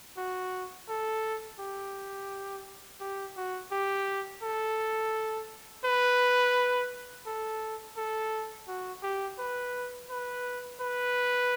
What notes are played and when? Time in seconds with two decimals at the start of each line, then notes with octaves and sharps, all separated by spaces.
0.18 F#4
0.89 A4
1.60 G4
3.00 G4
3.37 F#4
3.71 G4
4.43 A4
5.85 B4
7.26 A4
7.97 A4
8.68 F#4
9.03 G4
9.39 B4
10.10 B4
10.81 B4